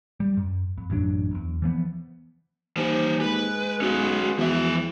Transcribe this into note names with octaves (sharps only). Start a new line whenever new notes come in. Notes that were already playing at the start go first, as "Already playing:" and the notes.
G3
F#2
F2
A1 F#2 F#3 D4
E1 E2
E3 F3 B3
D#2 E3 C5
G#3 B4
B1 C#4 F#4 B4
E2 F3 E5